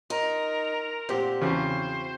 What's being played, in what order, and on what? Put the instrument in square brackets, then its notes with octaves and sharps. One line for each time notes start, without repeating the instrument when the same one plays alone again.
[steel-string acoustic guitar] D#4 [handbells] F4 [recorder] A#4
[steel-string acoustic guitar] A#2 [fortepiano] C4 G4 [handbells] F4 F#5
[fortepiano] E2 C#3 [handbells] C4 F#4 [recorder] C5